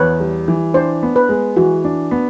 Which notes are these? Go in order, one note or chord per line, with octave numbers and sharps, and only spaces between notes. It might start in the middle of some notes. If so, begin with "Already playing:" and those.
Already playing: E2 B4 C#5
G3
E3
D4 C5
B3
B4
G#3
E3 F#4
D4
B3